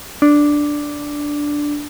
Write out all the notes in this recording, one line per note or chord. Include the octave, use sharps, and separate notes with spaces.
D4